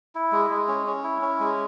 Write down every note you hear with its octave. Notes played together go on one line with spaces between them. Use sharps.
E4
G#3
G#3
C#4
C#4
E4
C#4
G#3